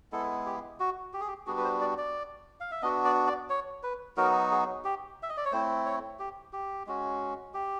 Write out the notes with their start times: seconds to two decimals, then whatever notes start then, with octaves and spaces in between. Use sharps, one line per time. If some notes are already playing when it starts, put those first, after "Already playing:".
0.12 G#3 B3 E4 A4
0.46 G4
0.80 F#4
1.14 G4
1.21 G#4
1.28 G4
1.47 G3 B3 D4 F#4 G#4
1.57 B4
1.64 C5
1.81 D5
1.98 D5
2.60 F5
2.71 E5
2.82 B3 D4 F#4 D#5
3.05 D5
3.27 D5
3.50 C#5
3.83 B4
4.17 F#3 B3 D#4 F#4 A#4
4.51 G#4
4.84 G4
5.23 E5
5.29 D#5
5.37 D5
5.45 C#5
5.52 A3 C4 E4 C5
5.86 C#5
6.19 G4
6.53 G4
6.87 G#3 C#4 F#4
7.54 G4